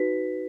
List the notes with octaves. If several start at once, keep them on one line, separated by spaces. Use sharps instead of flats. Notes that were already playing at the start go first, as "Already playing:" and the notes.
Already playing: D#4 F#4 B4 B6